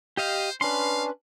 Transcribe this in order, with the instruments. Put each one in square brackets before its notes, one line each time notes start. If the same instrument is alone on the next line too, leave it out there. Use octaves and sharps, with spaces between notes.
[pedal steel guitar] G4 D#5 F5 [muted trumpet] C5
[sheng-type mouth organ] C#4 D4 [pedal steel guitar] B4 C6 [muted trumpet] F5